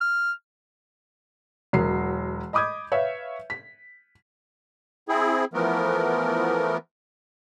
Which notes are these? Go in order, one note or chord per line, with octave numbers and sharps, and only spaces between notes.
F6
E1 F#3 A#4 C7
D#5 B5 D6 D#6 G6 G#6
B4 C#5 E5 F5
B6
C4 E4 G#4
E3 F3 A3 B3 A#4